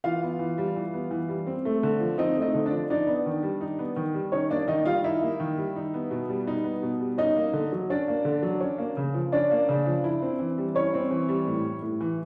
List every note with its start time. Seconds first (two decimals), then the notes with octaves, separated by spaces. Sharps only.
0.04 E3 F4 F5
0.23 B3
0.39 E3
0.58 G3
0.76 E3
0.94 B3
1.11 E3
1.29 G3
1.47 C4
1.65 A3
1.83 D3
2.00 F3
2.18 C4 D#4 D#5
2.36 A3
2.42 D#4 D#5
2.54 D3
2.66 D4 D5
2.71 F3
2.90 D4 D#4 D5
3.07 B3
3.26 D#3
3.43 G3
3.61 D#4
3.79 B3
3.96 D#3
4.14 G3
4.32 C#4 D#4 C#5
4.50 A#3 D4 D5
4.68 D#3 D#4 D#5
4.86 G3 F4 F5
5.04 D#4 E4 E5
5.22 A#3
5.40 D#3
5.58 G3
5.76 D#4
5.94 B3
6.11 B2
6.29 G3
6.47 D#4
6.64 B3
6.82 B2
7.00 G3
7.18 C#4 D#4 D#5
7.36 A#3
7.53 D3
7.72 F#3
7.90 C#4 D4 D5
8.08 A#3
8.25 D3
8.43 F#3
8.61 C#4
8.78 A#3
8.97 C#3
9.14 F3
9.32 C#4 D4 D5
9.51 A#3
9.69 C#3
9.86 F3
10.04 E4
10.22 C4
10.39 E3
10.58 G3
10.75 C#4 E4 C#5
10.94 C4
11.11 E3
11.29 G3
11.47 A2
11.64 G3
11.82 A2
12.01 E3